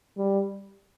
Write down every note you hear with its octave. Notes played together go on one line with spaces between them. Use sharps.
G3